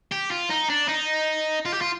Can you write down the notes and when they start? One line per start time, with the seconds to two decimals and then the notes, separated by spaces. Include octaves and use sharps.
0.12 G4
0.31 F4
0.50 D#4
0.70 D4
0.89 D#4
1.65 F4
1.73 G4
1.81 F4